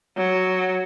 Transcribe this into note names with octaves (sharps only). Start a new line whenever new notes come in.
F#3